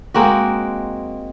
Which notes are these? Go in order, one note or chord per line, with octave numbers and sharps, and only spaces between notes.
G#3 A#3 C4 F#4